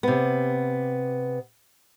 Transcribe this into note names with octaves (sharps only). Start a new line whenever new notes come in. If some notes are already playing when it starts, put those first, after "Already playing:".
C3 B3